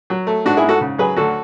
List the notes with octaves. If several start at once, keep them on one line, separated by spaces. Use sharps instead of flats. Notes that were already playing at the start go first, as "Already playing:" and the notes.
F#3
A3
G#2 D4 F#4
E4 G#4
G#2
F#4 A4
C#3
F#3 G#4 B4
D2 F#4 A4